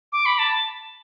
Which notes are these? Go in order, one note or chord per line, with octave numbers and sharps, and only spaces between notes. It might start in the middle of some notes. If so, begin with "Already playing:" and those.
D6
B5
A5